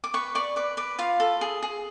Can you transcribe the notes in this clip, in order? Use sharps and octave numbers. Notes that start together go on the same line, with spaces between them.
D6
B4 C#6
D5 C#6
B4 D6
B4 D6
F4 F5
A4
G#4
G#4